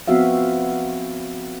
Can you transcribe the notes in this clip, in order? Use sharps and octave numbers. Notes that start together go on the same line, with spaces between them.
F3 B3 C4 F#4 E5 F5